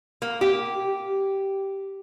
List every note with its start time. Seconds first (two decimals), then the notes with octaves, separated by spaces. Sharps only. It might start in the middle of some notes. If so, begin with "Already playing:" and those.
0.22 A#3
0.41 G4